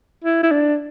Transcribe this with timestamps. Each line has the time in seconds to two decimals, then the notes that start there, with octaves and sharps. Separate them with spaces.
0.24 E4
0.43 E4
0.51 D4